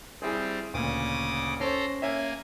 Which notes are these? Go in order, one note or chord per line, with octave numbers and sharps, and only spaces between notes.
G3 C4 E4 G#4
D2 A#2 C#3 D6 D#6
C#4 A4 C5 C#5 A#5 C6
A#3 C#4 E5 G#5